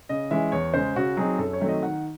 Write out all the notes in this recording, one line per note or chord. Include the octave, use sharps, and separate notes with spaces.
C#3 D#5
E3 G#3 C#4 E5
E2 C#5
C#3 G#3 C5
C#3 F#4
F#3 C4 D#4 G#4
F#2 A4
C#5
D#3 F#3 A3 C4
D#5
D#3 F#5